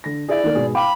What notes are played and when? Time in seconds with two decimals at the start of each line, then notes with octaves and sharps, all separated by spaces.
0.04 D3 A#6
0.28 E4 G#4 D5
0.44 D#3 A#3 A#4
0.55 G#2 B2 G#4
0.75 F5 G5 B5 D6